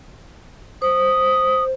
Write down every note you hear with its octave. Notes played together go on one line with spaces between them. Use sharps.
C5 D#6